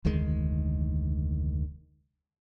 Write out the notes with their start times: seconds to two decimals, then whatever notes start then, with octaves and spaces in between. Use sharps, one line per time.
0.05 F1 D2 D#3 G#3